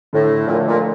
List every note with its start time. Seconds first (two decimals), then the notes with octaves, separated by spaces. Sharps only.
0.13 A2 D3
0.47 A#2 F3 A3 D#4
0.57 A2
0.67 A#2